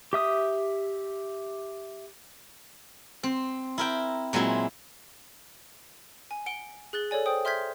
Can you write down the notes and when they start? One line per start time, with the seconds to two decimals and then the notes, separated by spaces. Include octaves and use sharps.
0.13 G4 E5 D#6
3.23 C4
3.78 E4 A#4 G5
4.33 A#2 F#3 G#3 C4 E4
6.31 G#5
6.46 F#5 D7 G7
6.93 G#4 F#6 A6 G7
7.11 A4 C#5 D5 G#5
7.26 C5 G5 D#6
7.45 E5 C6 F6 G6 G#6 B6